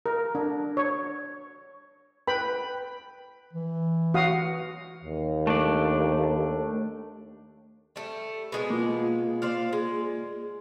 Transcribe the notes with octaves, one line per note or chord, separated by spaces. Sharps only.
A#4
D4
C#5
B4 G5 B5
E3
F#4 F5 D#6
D#2
A3 D4 D5
G3 A3
B2 G#3 B3
A#3 F4
C5 D5 F5
G#3